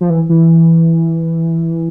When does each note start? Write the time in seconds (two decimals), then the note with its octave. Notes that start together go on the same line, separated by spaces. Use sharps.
0.01 F3
0.10 E3
0.29 E3